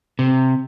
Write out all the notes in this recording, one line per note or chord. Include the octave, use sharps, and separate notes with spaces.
C3